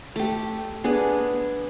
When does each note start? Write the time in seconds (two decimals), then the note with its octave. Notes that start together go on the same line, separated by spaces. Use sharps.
0.16 A3 G4
0.84 B3 D4 G#4